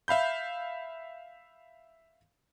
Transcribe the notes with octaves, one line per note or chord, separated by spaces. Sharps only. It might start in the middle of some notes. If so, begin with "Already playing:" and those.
E5 F5 B5 G6